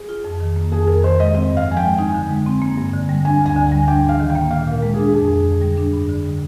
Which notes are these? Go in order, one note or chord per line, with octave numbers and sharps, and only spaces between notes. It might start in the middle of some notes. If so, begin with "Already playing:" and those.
Already playing: G#4
F4
F2
D#3
A#3
F2 G#4
F2 A#4
D#3 C5
G#3 D#5
C4 D#5
G2
F5
F3
G#5
G5
G#3
D#4 G#5
D3
G#3
C4
A#3
G2
D3
G3
D4 G#5
D2 G#5
D3
G#5
G3
D4 G5
G#2 F5
D#3
G5
A#3
A#2 F5
A#2 A#4
G#3
D4 G#4
F2 G#4
F2
D3
G3
D4
G2
D3
G3